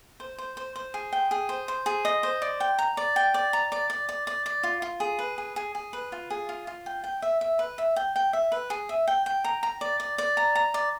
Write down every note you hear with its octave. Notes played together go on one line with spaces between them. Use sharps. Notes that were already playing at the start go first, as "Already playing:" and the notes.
C5
C5
C5
C5
G#4
G5
G#4
C5
C5
G#4
D#5
C5
D5
G5
A#5
D5
G5
D5
A#5
D5
D5
D5
D5
D5
F4
F4
G#4
B4
G#4
G#4
G#4
B4
F4
G#4
F4
F4
G5
G5
E5
E5
B4
E5
G5
G5
E5
B4
G#4
E5
G5
G5
A#5
A#5
D5
D5
D5
A#5
A#5
D5